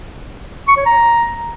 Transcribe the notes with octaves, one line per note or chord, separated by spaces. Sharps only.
C#6
C#5
A#5